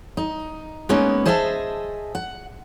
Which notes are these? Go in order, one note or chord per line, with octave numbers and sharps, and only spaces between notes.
D#4
G#3 A#3 B3 C#4 D#4
G#4 C5 D#5 E5 G5 A5
F#5